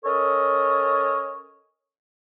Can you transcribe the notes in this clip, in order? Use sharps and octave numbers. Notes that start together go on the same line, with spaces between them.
C#4 A4 A#4 C#5 D#5